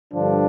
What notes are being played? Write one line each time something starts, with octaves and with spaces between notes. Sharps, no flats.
G2 D3 F3 D4